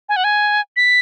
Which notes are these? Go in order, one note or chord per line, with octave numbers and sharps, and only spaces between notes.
G#5
F#5
G#5
B6